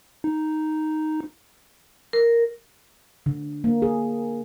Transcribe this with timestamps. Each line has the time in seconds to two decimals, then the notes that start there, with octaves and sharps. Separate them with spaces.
0.24 D#4
2.13 A#4
3.26 D3
3.64 A#3
3.82 G#4